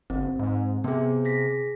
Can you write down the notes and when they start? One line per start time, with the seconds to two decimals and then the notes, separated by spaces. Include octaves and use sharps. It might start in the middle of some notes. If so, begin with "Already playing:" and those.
0.10 G1 C4
0.39 G#2
0.84 C3 B3 G#4
1.25 G#4 A#6 B6